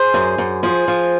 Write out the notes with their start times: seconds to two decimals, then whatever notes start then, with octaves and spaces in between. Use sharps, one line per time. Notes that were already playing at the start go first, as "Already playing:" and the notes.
Already playing: G#4 C5
0.14 F#2
0.38 F#2
0.63 F3 G#4 C5
0.88 F3